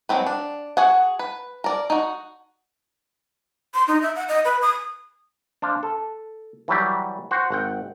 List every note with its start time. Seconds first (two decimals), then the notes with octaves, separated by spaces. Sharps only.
0.09 F#3 G#3 C4 B4
0.26 D4
0.77 F#4 G#4 F#5
1.19 B4
1.64 A#4 D5
1.90 D#4 F#4
3.74 C6
3.88 D#4
4.02 E5
4.16 F#5
4.29 D#5
4.45 B4
4.62 D#6
5.62 D4 C5 F5
5.83 A4
6.68 E3 F#3 G3 G4
7.31 F#4 C5 F#5
7.50 G#1 F#5 G5